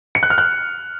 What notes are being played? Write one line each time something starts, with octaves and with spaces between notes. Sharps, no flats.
C#7
F#6
F6
F#6